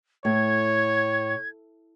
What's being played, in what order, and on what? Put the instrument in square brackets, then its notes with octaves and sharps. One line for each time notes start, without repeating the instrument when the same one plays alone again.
[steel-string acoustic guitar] A2 [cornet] C#5 [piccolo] G#6